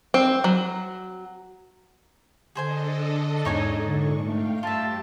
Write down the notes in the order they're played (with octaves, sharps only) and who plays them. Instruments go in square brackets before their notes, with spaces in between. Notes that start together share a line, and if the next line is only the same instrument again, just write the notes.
[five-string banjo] C4
F#3
[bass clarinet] D3 [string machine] D4 A4 D#5 [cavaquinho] G#4 C5 G#5
[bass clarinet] E2 [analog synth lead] G#2 [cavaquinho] D#4 C#5 G#5
[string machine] A#2 D4 C#6 [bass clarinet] D3
[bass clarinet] A3 [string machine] F5 G5
[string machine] G2 G4 [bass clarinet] A3 [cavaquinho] F4 E5 [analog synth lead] A5